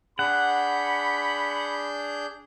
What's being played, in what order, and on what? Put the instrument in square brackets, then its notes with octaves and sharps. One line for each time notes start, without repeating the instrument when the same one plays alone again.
[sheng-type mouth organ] D4 G#4 G6 [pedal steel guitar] F#5 [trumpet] B5